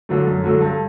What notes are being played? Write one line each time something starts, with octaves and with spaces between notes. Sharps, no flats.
D3 F#3 A3
F#2
D3 F#3 A3
G2